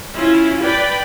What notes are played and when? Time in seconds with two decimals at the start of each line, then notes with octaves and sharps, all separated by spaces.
0.14 C#4 E4 F4
0.62 B4 D5 G5 B5